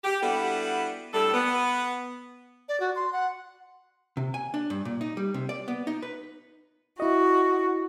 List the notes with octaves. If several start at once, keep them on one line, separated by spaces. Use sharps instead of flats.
G4
G3 B3 D4 E4 F#4 A4
A2 G3 D4 A4
B3
D5
F#4
C6
F#5
C3
G#5
D4
G2
A#2
D#4
G3
C3
D5
B3
D#4
B4
E4 F#4 D#5